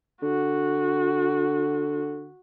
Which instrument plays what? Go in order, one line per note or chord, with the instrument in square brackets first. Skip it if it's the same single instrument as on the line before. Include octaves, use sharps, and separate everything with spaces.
[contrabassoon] D3 [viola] F#4